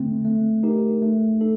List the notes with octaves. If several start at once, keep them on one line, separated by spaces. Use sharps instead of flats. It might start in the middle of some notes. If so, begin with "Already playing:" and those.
Already playing: D3 A3 C4
A3
D#4 G4 A#4
A3
D#4 A4